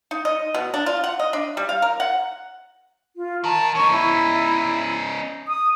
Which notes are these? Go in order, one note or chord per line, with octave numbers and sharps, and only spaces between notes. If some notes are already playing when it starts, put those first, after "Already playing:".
D#4
D#5
B2
D4
F4
F#5
D#5
D4
G3
F5
A#4
F#5
F4
D#3 A#4 A5
C#4 D#4 C#6
E4
D#6